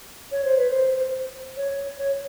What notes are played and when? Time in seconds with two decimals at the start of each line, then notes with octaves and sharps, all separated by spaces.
0.32 C#5
0.45 C5
0.57 B4
0.71 C5
1.57 C#5
1.98 C#5